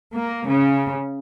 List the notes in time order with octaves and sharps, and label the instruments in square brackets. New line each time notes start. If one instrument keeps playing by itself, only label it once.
[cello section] A#3
C#3